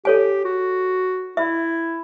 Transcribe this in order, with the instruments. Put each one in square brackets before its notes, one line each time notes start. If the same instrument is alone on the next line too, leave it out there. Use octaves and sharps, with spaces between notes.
[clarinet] G4 [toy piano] A4 C#5 G#5
[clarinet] F#4
[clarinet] E4 [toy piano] E5